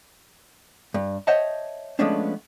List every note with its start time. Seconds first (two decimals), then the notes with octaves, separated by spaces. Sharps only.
0.94 G2
1.27 C5 C#5 D#5 E5 F#5 A5
1.99 F3 G#3 A3 B3 C#4 D4